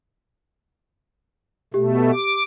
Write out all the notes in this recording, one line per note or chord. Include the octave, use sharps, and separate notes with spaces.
B2 A3 G4
D6